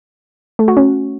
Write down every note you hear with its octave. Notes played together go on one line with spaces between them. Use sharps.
A3
F#4
C#4